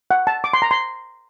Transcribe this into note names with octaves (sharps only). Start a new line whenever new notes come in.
F#5
A5
D6
C6
A#5
C6